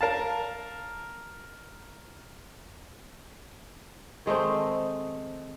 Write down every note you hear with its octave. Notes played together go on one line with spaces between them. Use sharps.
A#4 F5 A5
D#3 G#3 A3 C4